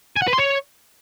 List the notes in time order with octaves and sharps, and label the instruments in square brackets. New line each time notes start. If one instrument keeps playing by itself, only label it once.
[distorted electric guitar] G#5
F#5
B4
C6
C#5